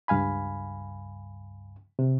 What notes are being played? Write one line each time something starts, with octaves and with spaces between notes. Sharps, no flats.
C#2 G2 F5 G#5 B5
C3